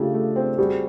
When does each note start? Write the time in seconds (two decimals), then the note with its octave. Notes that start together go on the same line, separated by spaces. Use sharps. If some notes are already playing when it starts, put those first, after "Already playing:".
Already playing: C#3 A3 D4 F4 G4
0.14 A3
0.36 C4
0.58 G3 F#4 G#4